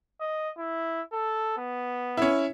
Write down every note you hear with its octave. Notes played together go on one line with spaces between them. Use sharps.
D#5
E4
A4
B3
C#4 E4